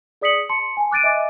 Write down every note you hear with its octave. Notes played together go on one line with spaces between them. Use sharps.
G#4 D5 D#6 B6 C#7 F#7
A5 C6 C#7
G#5 A5
D6 F#6 A6 D7 D#7
D#5 E5 G#5 D6